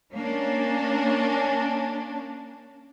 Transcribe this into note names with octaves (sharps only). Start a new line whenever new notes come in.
A#3 C#4 D4